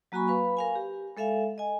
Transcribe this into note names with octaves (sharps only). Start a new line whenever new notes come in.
F#3 A#3 F#4 G#5 B5 C#6
B4 F5 B5
A#4 F5 G#5
G4
G#3 A4 E5 F5 G#5
D#5 G#5